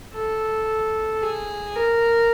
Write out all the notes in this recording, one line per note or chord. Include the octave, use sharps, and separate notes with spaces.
A4
G#4
A#4